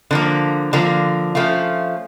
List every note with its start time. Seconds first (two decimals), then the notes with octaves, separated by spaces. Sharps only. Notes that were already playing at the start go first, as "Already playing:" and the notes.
0.11 D3 F3 A#3
0.73 D3 F3 A#3
1.35 F3 A3 C#4 F4